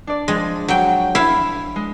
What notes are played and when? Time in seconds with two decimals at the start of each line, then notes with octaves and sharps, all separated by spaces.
0.07 D4 D5
0.28 F3 G#3
0.68 F#3 G5
1.15 E4 E5 F5
1.76 G#3